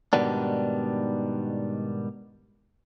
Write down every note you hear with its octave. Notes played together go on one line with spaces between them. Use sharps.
G#2 B2 D#3 G3 B3 D4